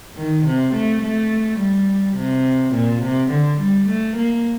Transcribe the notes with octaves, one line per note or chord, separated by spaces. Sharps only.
D#3
C3
A3
A3
G3
C3
A#2
C3
D3
G3
A3
A#3